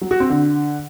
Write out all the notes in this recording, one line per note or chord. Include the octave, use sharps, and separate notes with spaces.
F#3
F#4
C4
D3